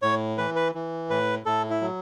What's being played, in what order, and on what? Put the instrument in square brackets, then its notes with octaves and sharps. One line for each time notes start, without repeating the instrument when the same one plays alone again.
[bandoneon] A2 C#5
E3 B4
B4
E3
A2 B4
A2 A4
E4
F#3